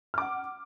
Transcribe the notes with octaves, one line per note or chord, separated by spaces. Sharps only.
F#5 D6 F6